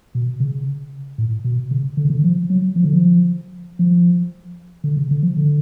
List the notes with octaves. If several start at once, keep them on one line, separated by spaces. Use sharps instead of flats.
B2
C#3
A2
B2
C#3
D3
C#3
D3
F3
F#3
F3
D3
F3
F3
D3
C#3
D3
F3
D3